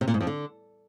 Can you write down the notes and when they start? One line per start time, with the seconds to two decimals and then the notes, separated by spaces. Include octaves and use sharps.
0.01 C3
0.08 A#2
0.14 G#2
0.20 F2
0.27 D3